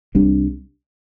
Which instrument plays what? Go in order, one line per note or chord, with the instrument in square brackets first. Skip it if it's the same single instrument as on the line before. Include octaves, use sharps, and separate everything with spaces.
[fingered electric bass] C2 C3 G3 D4